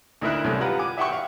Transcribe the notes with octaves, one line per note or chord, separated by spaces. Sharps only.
D2 D#4 E4 A#4 E5 F#6
C2 F#2 A3
F4 G4 B4 F#5 A#5
G#5 D6
E5 F#5 G5 C#6
F5